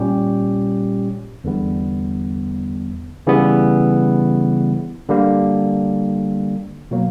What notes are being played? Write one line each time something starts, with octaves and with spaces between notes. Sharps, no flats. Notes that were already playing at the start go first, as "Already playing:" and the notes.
Already playing: A#2 G3 C#4 G4
E2 D3 G3 B3
C#3 E3 G3 B3
D3 G3 A#3
B2 F#3 A#3